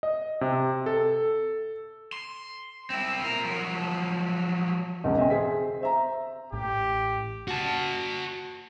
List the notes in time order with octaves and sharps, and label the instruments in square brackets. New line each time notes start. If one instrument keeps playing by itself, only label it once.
[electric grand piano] D#5
C3
A4
[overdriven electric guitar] C6
C4 E4
F4 A#4
F3 F#3
[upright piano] F#1 B1 E2 G#2 C#3
D#5 E5 G5 G#5 C6
C4 G#4 B6
C5 E5 A#5
[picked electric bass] A1 A2 [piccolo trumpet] G4
[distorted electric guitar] F#4 A5